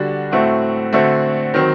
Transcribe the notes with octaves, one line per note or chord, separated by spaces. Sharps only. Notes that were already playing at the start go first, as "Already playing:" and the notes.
Already playing: D3 G3 D4 F#4
A2 A3 C4 F#4
D3 A3 C4 F#4
D#3 F#3 C4